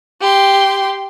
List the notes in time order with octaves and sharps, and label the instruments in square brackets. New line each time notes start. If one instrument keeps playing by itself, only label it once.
[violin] G4 C6